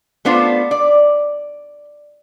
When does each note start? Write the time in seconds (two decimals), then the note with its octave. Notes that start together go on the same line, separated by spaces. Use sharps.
0.25 A3 B3 D4 F4 C5
0.71 D5